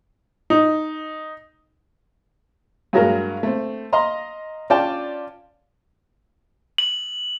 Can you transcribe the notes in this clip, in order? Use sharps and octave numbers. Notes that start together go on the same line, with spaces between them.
D#4
G2 F#3 G#3 F#4 A#4
A3 C4
D#5 F5 A#5 C6
C#4 F4 D5 G5 A5
F#7